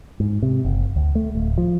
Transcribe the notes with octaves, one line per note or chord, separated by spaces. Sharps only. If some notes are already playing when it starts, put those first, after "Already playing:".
G#2
C3
F#1
D2
A3
D1
F3